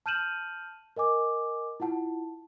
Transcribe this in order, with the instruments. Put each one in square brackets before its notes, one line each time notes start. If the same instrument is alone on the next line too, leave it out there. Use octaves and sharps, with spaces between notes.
[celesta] A5 F6 G6 D#7 E7 F#7
A#4 D#5 G#5 D6
E4 F4 F#5 A5